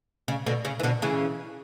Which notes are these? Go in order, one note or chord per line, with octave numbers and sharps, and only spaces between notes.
C#3
B2 D3
C#3
E3
B2 D3
C#3 E3